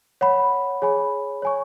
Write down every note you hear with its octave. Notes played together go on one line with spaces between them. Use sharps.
C#5 F#5 B5
G#4 C#5 G#5 B5
C#5 G#5 C#6